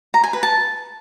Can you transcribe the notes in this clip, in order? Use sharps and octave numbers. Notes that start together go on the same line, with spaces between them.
A#5
G#5
B4
A5